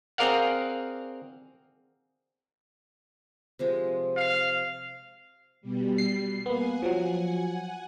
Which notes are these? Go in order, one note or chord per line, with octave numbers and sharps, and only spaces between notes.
C4 G#4 A#4 D5 F5 F#5
C3 F3 G#3
F5
B2 G3
C7
A#3 B3 F#5 G#5
F3 F#3